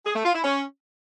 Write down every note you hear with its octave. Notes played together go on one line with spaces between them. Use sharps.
G#4
A3
F4
E4
C#4